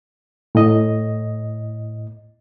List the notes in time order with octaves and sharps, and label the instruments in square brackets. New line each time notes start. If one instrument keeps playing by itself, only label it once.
[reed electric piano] A2 D#5